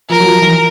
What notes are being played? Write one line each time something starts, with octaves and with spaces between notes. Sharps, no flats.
F3 A#4
F#3
F3
E3